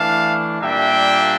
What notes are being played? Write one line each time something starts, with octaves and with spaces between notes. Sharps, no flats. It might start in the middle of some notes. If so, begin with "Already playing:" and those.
Already playing: E3 A3 D4 F5 A5
A#2 G3 A#3 D4 E5 G5